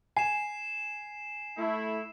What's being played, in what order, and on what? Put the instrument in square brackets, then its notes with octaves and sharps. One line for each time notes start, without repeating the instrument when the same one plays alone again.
[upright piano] G#5 [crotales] C7 E7
[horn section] A3 E4